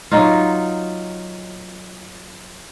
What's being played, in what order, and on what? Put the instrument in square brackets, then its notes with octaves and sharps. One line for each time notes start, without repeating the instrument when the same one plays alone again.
[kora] F#3 D#4 F4